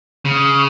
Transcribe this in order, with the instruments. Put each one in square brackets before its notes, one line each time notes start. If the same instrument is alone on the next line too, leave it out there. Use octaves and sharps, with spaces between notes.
[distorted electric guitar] C#3